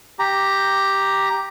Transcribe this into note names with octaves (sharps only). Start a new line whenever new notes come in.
G4 A#5